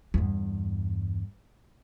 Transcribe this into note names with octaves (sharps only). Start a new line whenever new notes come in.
E2 G2